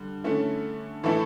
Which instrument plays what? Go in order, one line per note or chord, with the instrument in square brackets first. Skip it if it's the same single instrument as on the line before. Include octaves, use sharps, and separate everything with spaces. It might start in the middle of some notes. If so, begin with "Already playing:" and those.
Already playing: [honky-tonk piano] D3 G3
D3 A3 C#4 E4
A2 E3 A3 E4 A4